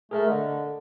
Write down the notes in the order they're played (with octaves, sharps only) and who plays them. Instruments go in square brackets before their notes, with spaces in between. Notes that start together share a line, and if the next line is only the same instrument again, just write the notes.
[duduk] A3 [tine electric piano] G#4 A#4 E5
[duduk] D3 [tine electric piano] D#5